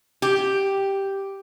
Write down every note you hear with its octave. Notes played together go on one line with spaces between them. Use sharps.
G4